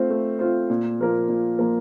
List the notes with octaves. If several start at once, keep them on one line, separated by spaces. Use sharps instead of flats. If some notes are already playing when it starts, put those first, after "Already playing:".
Already playing: A3 C4 F4 C5
A3
C4 F4 C5
A#2
F3 A#3 F4 A#4
A#2
F3 A#3 F4 A#4